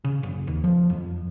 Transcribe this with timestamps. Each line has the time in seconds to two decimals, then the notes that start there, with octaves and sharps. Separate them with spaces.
0.04 C#3
0.23 F#1
0.47 D#2
0.64 F3
0.90 F2